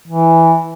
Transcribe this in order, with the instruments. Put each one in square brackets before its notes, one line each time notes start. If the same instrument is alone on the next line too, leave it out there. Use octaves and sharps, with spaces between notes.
[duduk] E3